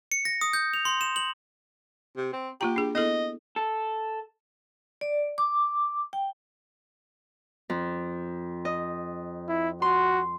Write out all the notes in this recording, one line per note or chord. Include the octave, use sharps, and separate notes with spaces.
C#7
A#6
D#6
G6
F7
C6
E7
F#7
C3
C4
A#3 F4 G4 A#5
D4 G#4
B3 E4 A4 D#5
A4
D5
D6
G5
F2
D#5
E4
F#4 C6